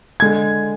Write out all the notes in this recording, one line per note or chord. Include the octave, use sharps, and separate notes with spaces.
D3 G#3 G#6